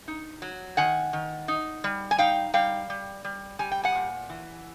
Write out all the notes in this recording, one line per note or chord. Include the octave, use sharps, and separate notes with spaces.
D#4
F#3
D#3 F#5 G#5
D#3
D#4
G3
G#5
D#4 F5 G5
G3 F5 G5
G3
G3
G3 G#5
G5
F#5 G#5
A#2
E3